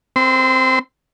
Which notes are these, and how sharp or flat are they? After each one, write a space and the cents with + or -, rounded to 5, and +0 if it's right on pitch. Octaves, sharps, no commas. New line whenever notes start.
C4 +0 C6 -30